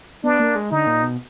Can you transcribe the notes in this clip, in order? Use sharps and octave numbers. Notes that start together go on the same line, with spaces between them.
B3 D4
A#3
G#3
D3 D#4
A#2
B2